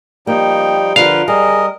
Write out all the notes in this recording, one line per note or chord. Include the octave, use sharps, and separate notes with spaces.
F3 G3 A#3 D#4 G5
D3 F3 F4 A#4 B4 F5
G3 G#4 A#4 D#5